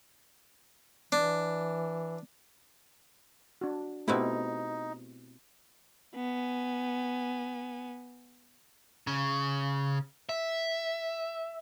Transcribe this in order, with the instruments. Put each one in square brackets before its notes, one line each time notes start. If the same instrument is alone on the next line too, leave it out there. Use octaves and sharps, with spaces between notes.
[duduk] E3 [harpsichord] D4
[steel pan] D4 F#4
[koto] B2 C4 E4 [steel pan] A3 B3 G4 [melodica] D#4
[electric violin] B3 G#5
[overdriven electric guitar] C#3
E5